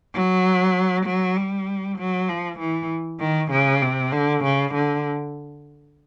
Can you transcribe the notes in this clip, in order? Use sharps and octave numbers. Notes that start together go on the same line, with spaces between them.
F#3
F#3
G3
F#3
F3
E3
D#3
C#3
C3
D3
C#3
D3